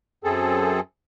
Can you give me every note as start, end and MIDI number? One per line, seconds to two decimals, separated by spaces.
0.24 0.80 42
0.24 0.80 60
0.24 0.80 68
0.24 0.80 69